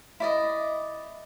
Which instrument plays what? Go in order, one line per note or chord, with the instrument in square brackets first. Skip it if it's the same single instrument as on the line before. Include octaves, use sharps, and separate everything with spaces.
[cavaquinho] E4 D5 D#5